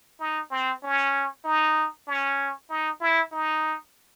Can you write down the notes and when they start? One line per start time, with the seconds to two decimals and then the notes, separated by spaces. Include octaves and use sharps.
0.20 D#4
0.51 C4
0.83 C#4
1.45 D#4
2.08 C#4
2.70 D#4
3.01 E4
3.32 D#4